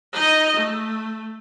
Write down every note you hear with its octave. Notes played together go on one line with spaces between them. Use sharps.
D#4 D#5
A3